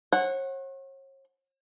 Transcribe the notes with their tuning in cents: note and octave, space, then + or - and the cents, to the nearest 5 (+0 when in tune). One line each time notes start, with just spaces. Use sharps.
C#5 -45 F#5 +0